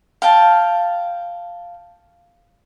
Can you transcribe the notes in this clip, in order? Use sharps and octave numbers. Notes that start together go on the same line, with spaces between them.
F5 G5 A5